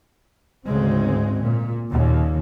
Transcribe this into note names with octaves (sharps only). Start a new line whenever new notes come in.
D2 G#2 C#3 G#3 C4
A#2
D#2 A#2 C#3